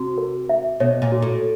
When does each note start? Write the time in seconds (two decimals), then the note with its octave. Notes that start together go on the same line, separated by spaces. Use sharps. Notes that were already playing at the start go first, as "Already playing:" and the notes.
Already playing: C3 F#4
0.18 A#4
0.49 E5
0.80 B2 C#5
1.02 A#2
1.12 F#4
1.22 A2